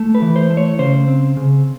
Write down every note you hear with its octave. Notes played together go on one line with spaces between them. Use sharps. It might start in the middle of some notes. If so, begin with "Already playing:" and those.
Already playing: A3
B4
E3
C5
A3
C#5
C#3 C5
C4
C#3